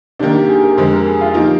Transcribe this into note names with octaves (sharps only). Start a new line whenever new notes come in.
C3 D#3 A#3 D4
G4
G#4
A#4
F2 D3 G#3 C5
A#4
G#4
F4
C3 F3 A#3 D#4 F4